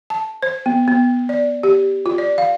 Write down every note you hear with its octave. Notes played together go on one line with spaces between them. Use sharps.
A5
C5
B3
B3
D5
G4
F4
D5
F5